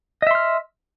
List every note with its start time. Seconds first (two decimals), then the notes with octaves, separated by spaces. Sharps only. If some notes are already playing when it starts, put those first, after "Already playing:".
0.22 D#5
0.27 E5
0.31 C6
0.35 F6